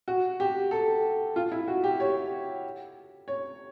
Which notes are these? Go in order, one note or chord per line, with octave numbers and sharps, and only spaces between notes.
F#4
G4
A4
F4
E4
F#4
G4
C#5
C#5